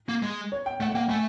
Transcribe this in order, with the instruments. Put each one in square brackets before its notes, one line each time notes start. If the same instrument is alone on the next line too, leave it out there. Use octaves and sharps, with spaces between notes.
[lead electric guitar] A#3
G#3
[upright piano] C#5
G5
[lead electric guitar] A3 [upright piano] F#5
[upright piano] F#5
[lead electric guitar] A#3 [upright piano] G5
[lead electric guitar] A3 [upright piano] G#5